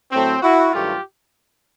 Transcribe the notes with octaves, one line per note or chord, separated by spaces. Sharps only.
A2 F#3 A3 C4
E4 F#4
G2 D#3 F#3 A3 F4 G4